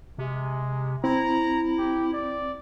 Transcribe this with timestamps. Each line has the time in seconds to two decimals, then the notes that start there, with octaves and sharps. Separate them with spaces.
0.18 C3 G#3
1.04 C4 E4 A#5
1.79 G4
2.13 D5